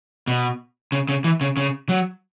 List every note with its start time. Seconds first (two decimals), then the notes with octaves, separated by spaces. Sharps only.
0.27 B2
0.92 C#3
1.09 C#3
1.24 E3
1.41 C#3
1.57 C#3
1.89 F#3